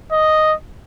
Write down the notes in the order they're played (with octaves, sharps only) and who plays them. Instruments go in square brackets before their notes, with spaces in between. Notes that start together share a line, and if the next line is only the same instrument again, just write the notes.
[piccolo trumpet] D#5